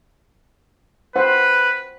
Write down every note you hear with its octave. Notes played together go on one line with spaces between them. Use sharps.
B4 C5 F#5